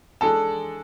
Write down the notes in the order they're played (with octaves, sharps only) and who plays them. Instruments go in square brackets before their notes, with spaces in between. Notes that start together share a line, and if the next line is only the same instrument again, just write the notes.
[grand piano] G#3 D4 A4